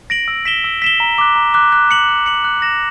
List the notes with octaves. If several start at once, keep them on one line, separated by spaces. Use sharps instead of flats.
A#6 D7 F#7
E6
B6 E7 G7
E6
B6 E7 G7
A#5
D6 F#6
A#5
D6 F#6
F#6
C#7 F#7
F#6
C#7 F#7
F#6
A#6 E7